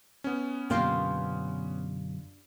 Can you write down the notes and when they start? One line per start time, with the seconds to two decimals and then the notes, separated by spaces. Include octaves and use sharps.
0.24 B3 C#4
0.70 F#2 B2 D3 A#3 D4 F4 G4 G5